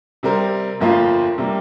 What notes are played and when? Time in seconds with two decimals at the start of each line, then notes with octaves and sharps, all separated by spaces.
0.23 C3 G3 C4 A#4
0.80 G1 F2 F3 A#3 F4
1.38 C3 G3 A#3